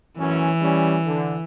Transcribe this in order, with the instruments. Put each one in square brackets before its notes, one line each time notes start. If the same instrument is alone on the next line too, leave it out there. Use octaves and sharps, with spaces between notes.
[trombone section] A1 F#2 C#4 [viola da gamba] E3
[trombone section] G3 C#4
D3